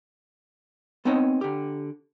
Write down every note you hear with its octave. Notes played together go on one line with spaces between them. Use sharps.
B3 C4 D#4 C#5 D#5
D3 G4